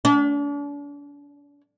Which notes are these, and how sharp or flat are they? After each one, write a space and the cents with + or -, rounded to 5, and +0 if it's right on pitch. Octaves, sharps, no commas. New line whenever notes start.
D4 -40